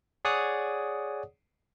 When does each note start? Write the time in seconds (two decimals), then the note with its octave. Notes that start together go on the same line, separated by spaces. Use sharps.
0.25 G#4 C#5 D5 F#5 D#6